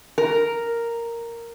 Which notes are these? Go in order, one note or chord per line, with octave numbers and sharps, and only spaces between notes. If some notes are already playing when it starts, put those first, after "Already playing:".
A#4